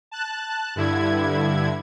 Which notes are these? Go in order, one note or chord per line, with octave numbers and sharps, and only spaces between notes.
A5 F#6
G2 D3 E4 G#6